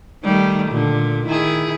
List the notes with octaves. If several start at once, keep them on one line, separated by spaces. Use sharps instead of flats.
D#3 G3 A3
A#2 D3
D#3 E4 G#4